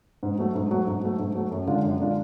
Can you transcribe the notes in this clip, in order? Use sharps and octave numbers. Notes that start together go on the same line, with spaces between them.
G#2
F#3 A3
G#2
F#3 A3
G#2
F#3 A3
G#2
F#3 A3
F#2
D3 G#3 D4 F4
F#2
D3 G#3 D4 F4